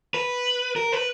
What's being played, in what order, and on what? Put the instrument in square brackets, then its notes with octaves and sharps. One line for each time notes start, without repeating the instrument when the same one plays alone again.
[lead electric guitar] B4
A#4
B4